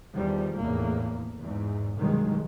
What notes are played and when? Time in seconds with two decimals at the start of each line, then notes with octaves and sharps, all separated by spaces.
0.14 E2 D#3 F3 G3
0.59 F1 E2 A2 A#3
1.40 E2 G#2
1.96 C2 G2 B2 D#3 F#3 G#3